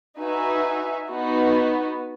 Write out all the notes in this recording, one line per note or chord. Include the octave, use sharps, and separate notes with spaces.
D#4 F#4 B4 E5 G#5
B3 D#4 F#4